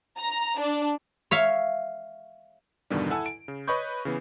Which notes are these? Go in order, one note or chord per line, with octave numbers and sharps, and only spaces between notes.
A#5
D4
C#5 E5 F5
E2 G2 B2 D3 D#3 G3
E4 A4 F#5 G#5 A5 E6
D7
C#3
B4 C#5 D#5 B5 C#6 G6
C#3 E3 B3